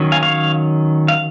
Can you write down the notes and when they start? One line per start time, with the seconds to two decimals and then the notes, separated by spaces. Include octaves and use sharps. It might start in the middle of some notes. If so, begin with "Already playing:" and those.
Already playing: D#3 F#3 C#4
0.12 F5 G#5
0.23 C#5 F5
1.08 F5